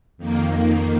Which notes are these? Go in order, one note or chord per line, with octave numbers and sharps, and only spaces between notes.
F2 D#3 A#3